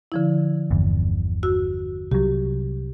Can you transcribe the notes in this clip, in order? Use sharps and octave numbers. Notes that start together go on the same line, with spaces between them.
D3 F3 E4
G1 E2
F#4 E6
C2 F#3 G4